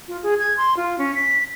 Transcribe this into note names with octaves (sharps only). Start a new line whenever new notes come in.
F4
G#4
G#6
C6
F4
C#4
B6